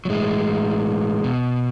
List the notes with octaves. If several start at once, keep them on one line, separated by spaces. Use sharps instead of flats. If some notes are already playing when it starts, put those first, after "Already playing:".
F#3
A2 E3 G#3
B2